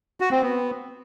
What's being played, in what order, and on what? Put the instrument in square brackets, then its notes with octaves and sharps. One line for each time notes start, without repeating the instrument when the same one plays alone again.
[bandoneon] F#4
C4
B3